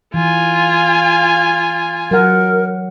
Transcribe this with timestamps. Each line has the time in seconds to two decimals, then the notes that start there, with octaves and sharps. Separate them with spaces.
0.14 E3 F4 G#5
2.11 F#3 A#4 F#5